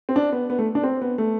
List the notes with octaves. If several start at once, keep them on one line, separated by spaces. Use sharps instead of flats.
C4
D4
B3
B3
A3
D4
C4
B3
A3